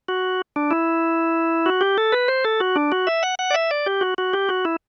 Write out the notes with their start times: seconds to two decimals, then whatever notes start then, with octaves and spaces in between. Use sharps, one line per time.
0.08 F#4
0.56 D4
0.71 E4
1.66 F#4
1.81 G4
1.98 A4
2.12 B4
2.28 C5
2.44 A4
2.60 F#4
2.76 D4
2.92 F#4
3.07 E5
3.23 F#5
3.39 F#5
3.51 D5
3.54 E5
3.71 D5
3.86 G4
4.01 F#4
4.18 F#4
4.33 G4
4.49 F#4
4.65 E4